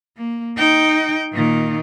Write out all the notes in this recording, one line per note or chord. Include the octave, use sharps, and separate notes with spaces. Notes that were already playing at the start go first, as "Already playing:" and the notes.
A#3
D#4 G5
A#2 D#3